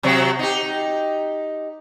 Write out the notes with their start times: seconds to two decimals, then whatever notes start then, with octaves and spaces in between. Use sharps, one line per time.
0.03 C3 F#3 C4
0.39 D#4 G4